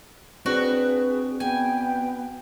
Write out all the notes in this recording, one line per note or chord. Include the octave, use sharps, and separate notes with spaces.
C4 D4 F#4 G#4 B4
B3 G5 G#5